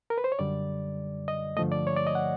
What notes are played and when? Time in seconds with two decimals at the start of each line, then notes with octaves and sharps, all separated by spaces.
0.10 A#4
0.18 B4
0.24 C5
0.32 C#5
0.39 F#2 D3 G3 D5
1.28 D#5
1.57 G2 D3 F3 A3 D#5
1.72 D5
1.87 C#5
1.96 D5
2.07 D#5
2.15 F#5